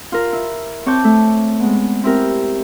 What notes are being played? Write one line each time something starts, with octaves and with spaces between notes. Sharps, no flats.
F4 A#4
E4
C4 C#5 A5 D6 G6
A3
G#3 B3
C4 E4 G4 A#4